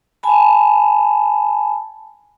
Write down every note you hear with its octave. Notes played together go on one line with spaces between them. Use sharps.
G#5 A5 B5